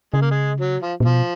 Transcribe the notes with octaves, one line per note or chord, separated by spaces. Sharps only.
C#3 G#3
A#3
G#3
F#3
F3
A#2
B2 F3